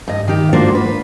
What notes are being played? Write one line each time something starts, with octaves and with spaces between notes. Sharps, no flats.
G2 D#5
D#3 G4
A#3 D4 F4 F#4 C5
B4